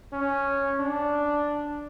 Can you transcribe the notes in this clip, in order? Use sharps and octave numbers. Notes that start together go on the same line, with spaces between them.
C#4
D4